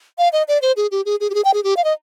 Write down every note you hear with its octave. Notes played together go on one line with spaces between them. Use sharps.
F5
D#5
D5
C5
G#4
G4
G#4
G#4
G4
G#4
G5
G#4
G4
F5
D#5